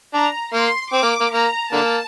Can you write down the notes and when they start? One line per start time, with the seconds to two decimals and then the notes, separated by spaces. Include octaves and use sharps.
0.14 D4 A#5
0.53 A#3 C6
0.93 C4 D6
1.02 A#3
1.20 A#3
1.33 A#3 A#5
1.72 D3 A#3 A5